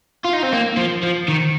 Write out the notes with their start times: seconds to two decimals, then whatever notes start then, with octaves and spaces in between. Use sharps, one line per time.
0.25 F4
0.33 D#4
0.43 C4
0.53 A#3
0.77 F3
1.03 F3
1.28 D#3